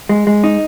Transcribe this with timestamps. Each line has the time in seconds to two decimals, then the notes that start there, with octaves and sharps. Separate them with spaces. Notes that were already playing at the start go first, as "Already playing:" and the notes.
0.09 G#3
0.27 G#3
0.44 D#4